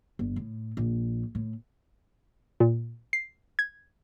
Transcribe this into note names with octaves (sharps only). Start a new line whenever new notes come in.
G1
A2
A#1
A2
A#2
C7
G#6